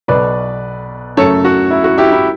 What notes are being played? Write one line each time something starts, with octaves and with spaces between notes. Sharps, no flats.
B1 B2 F#3 B4 D5
F#2 C#3 F#3 A3 A4 C#5
F#4
E4
F#4
E4 G4
E4